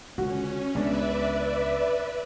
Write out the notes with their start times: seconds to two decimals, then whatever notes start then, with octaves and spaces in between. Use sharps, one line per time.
0.18 C#2 D3 C#4 F#4
0.75 C#2 C#3 G#3 B3 D4 B4 D5 E5